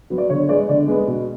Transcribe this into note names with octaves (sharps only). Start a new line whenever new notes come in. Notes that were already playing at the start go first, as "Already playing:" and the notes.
F#3 B3
D5
D3 C#5
G#3 B3 D5
D3 D5
G#3 B3
B2